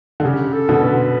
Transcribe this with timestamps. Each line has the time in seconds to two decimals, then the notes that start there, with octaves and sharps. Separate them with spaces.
0.20 D3
0.25 C#3 G4
0.53 A4
0.69 B2 D3
0.84 B4